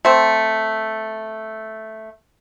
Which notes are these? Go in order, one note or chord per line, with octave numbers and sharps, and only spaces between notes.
A3 C4